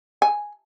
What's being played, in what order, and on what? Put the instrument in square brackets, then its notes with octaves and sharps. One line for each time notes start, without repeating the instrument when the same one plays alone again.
[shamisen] G#5